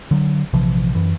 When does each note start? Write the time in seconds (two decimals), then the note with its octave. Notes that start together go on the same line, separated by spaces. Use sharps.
0.11 D3 F#3
0.53 A#1 C3 E3 F3
0.95 F#2 E3